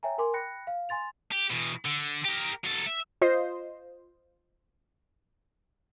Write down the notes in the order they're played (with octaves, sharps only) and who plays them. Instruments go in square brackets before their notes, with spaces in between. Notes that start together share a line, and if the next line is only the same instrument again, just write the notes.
[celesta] C#5 E5 G5 G#5 A#5
A#4 G#5 C6 D6
G5 B5 F#6 A#6 C#7
F5
G#5 C6 A6 F7
[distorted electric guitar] G4
E2 B2
D3
G4 A#4
F#3 A4
E5
[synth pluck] F4 C5 D#5 C7